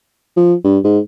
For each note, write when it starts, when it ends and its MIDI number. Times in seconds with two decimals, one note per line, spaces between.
0.37 0.54 53
0.64 0.78 43
0.84 0.99 44